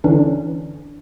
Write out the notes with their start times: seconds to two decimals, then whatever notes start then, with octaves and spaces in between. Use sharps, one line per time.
0.04 D3 E3 C#4 D4